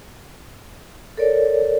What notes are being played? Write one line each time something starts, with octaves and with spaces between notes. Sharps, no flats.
A4 A#4 C#5 D5